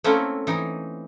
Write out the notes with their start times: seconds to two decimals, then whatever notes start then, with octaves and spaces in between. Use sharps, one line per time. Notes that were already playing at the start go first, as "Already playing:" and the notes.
0.04 A3 A#3 C4 C#4 E4
0.47 E3 D#4